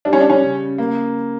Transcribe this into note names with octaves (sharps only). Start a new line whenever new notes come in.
G3 D4
C#4
D4
C#4
C#3
A#3